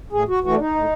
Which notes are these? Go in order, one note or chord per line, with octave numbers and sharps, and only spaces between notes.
A2 G#4
F#4
E3 A3 F#4
D4
D#4
A2